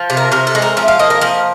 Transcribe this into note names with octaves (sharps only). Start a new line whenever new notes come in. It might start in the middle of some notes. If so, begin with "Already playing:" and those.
Already playing: F3
C3
A#4
C3 A#4
A4
G#3
A#4
F3 E5
F5
A#3 D#5
A#4
F3 A#4